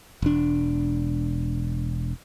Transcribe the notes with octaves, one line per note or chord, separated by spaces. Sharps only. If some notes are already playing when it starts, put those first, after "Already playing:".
E1 D4